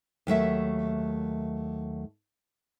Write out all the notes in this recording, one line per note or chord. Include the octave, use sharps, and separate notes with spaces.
D#2 F#3 A3 E5